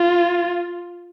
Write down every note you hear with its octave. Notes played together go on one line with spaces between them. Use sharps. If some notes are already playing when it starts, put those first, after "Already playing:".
Already playing: F4